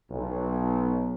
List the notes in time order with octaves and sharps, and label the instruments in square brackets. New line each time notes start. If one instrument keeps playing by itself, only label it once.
[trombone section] B1